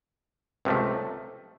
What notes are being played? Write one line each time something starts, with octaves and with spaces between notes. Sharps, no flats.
C#2 C3 F3 A3